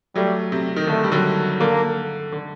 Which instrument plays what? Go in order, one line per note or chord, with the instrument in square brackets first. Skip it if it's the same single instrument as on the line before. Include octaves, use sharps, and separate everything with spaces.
[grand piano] F#3 A3 [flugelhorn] G3
[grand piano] C3
D#3
[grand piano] D3 [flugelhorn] A3
[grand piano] G3
D3 F#3
[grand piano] D3 [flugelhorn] A#3
[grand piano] D3